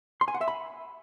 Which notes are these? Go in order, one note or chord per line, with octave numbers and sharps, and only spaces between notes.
C6
G#5
F#5
E5
B5